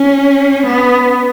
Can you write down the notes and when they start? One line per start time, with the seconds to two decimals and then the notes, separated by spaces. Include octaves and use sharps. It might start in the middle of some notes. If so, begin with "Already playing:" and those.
Already playing: C#4
0.67 B3